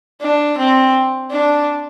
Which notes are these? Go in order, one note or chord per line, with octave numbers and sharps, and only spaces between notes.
D4
C4
D4